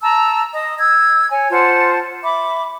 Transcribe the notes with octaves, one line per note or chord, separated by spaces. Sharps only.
A5 A#5 E6
D#5 D#6
E6 G#6
C#5 G#5
F4 C5 F#5 A5
E5 B5 D6